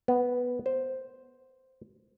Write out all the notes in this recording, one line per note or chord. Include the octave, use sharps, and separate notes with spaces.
B3
C5